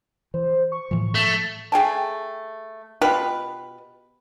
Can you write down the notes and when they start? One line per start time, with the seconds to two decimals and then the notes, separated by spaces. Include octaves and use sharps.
0.34 E3 C5
0.72 C#6
0.91 A2 E3 F3
1.15 A3
1.72 A3 G#4 G5 A5
3.01 B2 F4 G4 B4